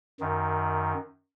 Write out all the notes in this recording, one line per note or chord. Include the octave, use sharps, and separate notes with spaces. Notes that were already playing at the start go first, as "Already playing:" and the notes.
F#2 D#3